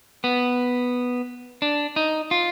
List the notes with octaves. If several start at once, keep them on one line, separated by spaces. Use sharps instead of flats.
B3
D4
D#4
F4